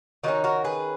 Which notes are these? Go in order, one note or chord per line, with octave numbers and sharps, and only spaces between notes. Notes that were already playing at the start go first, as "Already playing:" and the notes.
D#3 F#3 C#4 D#4 F#4
F#4 A#4
G#4 B4